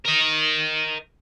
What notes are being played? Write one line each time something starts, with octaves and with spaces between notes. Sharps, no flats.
A#4 D#5